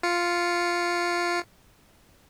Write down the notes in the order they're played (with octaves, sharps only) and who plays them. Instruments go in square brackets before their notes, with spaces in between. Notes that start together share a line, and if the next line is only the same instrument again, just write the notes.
[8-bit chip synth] F4 C#7